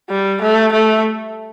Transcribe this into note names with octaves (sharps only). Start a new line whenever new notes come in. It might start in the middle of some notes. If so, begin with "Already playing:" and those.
G3
A3
A3